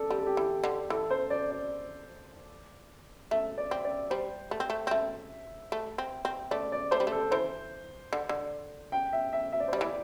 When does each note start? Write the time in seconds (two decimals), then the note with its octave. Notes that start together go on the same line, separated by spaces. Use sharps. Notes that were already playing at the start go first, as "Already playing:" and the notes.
Already playing: A4 D5
0.10 G3 G4
0.18 A4
0.27 G4
0.37 E3
0.64 D3
0.90 E3 A4
1.10 C5
1.30 D5
1.50 D5
3.31 A3 E5
3.58 D5
3.71 C4
3.85 D5
4.10 G3 C5
4.51 A3
4.60 C4
4.70 A3
4.87 C4
4.91 A3 E5
5.72 A3
5.98 C4
6.25 C4
6.51 A3 D5
6.72 D5
6.91 A3 C5
7.00 G3
7.07 A3 A4
7.31 E3 C5
8.13 D3
8.29 D3
8.92 G5
9.13 E5
9.33 E5
9.52 E5
9.60 D5
9.68 C5
9.73 G3
9.77 E3 D5